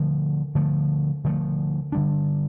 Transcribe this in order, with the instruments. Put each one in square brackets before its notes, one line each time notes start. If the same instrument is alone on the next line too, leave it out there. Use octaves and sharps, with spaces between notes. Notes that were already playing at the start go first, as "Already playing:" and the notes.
Already playing: [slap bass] D3 F3 A3
D3 F3 A3
D3 F3 A3
D3 G3 D4